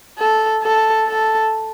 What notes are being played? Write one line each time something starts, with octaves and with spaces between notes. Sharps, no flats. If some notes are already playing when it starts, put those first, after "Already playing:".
A4
A4
A4